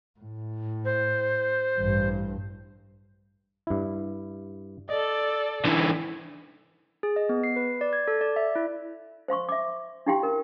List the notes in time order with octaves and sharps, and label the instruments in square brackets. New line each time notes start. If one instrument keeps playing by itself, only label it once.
[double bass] A2
[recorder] C5
[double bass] A1 G2
[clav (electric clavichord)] G2 E4
[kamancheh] A4 D5 [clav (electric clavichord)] D#5
[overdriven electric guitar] D3 E3
[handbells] G#4
D#5
B3
C7
B4
D5
G#6
A4
D5
E5
E4
[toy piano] C5 F5 C6 C#6
E5 D6
D4 E4 G4 F5 G5 C6
A#4